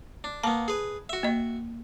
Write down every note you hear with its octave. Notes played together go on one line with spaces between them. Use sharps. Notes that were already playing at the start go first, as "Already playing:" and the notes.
D4
A#3 B3 A5
G#4 B4
F#4 E5
A#3 D#5